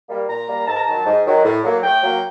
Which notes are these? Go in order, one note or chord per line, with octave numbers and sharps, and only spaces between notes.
G3 A#3
A#2 A#5
G3 A#3
G#2 A5
A#5
D#3 F#3 A5
G#2
D#3 F#3
A2
F#3 A#3
A2 G5
F#3 A#3